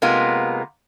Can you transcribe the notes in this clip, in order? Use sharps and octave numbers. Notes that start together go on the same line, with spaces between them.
C3 G#3 A#3 B3 F4